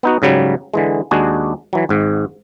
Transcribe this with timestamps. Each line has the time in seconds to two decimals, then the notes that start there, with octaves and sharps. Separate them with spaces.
0.03 B3 D#4 F#4
0.22 G#2 C#3 F#3 G3
0.74 D3 E3 G#3
1.11 D#2 G#3 D4 F#4 G#4
1.73 E3 F#3
1.89 G#1 G#2